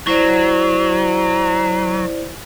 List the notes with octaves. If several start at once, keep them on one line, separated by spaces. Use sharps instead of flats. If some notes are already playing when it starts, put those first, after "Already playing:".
F#3 E4 C5 D5